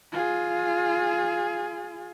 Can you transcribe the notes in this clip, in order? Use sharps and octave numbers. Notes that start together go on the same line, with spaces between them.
F4 G#4